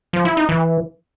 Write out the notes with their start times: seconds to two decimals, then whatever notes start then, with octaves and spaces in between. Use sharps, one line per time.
0.13 F3
0.25 E4
0.37 D#4
0.49 E3